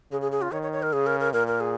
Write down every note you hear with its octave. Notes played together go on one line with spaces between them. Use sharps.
C#3 G#4
G#4
G#4
F4
D#3 C#5
C#5
C#5
A#4
C#3 G#4
A#4
A#4
A#2 A#4
A#4
G#4